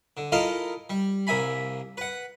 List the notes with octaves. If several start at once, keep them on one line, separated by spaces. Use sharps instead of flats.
D3
E4 F4 A4 A#4 D#5 F5
G3
C2 A#3 E5 G#5 B5
B4 F#5